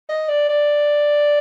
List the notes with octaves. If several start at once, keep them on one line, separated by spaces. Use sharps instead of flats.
D#5
D5
D5